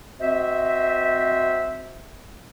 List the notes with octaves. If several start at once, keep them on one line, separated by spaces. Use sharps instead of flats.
C4 F#4 C5 D#5 E5